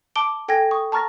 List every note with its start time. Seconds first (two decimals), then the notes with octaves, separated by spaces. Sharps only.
0.16 A5 D6 D7 G7
0.48 A4 G5 G#5 G#6 A#6
0.71 C#6 D#6
0.92 A5 A#5 C#6 F6 A6 A#6